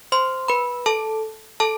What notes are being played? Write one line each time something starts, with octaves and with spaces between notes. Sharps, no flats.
C5 C6
B4 B5
A4 A5
A4 A5